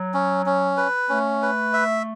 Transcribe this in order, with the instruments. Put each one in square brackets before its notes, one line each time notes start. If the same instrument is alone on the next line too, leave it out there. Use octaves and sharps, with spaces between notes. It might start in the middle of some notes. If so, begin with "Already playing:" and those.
Already playing: [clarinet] F#3
[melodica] C#4
C#4
B4
[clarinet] A3 [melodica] C#4
[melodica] B4
E5